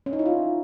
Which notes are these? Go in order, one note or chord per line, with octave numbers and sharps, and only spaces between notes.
C#4
D#4
E4
F4